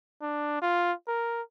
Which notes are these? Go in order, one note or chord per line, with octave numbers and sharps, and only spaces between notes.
D4
F4
A#4